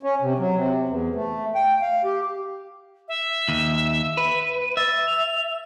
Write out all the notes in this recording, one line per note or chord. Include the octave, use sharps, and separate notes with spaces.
C#4
C3
F#3
C3
E2
A3
G5
F5
G4
E5
D#2
B4
E5 A6
F7